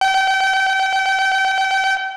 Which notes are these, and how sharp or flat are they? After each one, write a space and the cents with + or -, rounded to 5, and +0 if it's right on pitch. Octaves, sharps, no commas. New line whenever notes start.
G5 -35